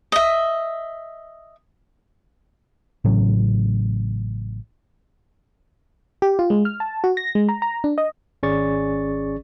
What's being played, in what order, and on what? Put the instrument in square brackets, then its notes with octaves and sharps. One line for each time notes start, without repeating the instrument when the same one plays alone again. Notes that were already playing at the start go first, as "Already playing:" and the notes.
[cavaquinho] D#5 E5
[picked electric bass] A1 A2 C#3 F#3
[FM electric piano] G4
F4
G#3
F6
A5
F#4
A#6
G#3
A#5
A#5
D4
D#5
[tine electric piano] G#1 C#4 G#4 D5 C#6 A6